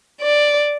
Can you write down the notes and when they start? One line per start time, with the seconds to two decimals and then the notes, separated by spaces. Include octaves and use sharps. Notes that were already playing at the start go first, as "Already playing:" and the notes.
0.22 D5